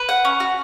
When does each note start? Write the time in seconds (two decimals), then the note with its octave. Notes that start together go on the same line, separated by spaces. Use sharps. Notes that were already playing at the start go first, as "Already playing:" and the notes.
Already playing: B4
0.09 F#5
0.25 C#4
0.40 F#4